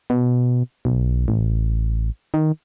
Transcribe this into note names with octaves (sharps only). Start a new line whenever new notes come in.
B2
B1
A1
D#3